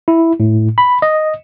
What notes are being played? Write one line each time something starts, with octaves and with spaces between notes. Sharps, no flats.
E4
A2
B5
D#5